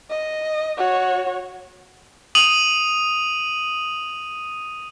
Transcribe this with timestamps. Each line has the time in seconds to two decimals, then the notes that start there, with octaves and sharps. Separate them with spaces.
0.10 D#5
0.77 F#4 C#5
2.35 D#6 D#7 F#7